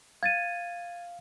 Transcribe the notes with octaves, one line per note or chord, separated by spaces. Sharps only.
F5 G#6 A6 D#7